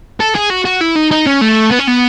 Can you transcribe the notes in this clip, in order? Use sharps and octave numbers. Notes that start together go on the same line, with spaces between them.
A4
G#4
F#4
F#4
E4
D#4
D#4
C#4
A3
B3
C#4
B3